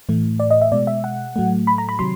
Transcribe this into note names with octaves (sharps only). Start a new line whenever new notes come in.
A2 E3 A3
D5
D#5
E5
B2 G#3 D5
E5
F#5
A2 F#3 A3
B5
A#5
B5
C3 D#3 F#3 C6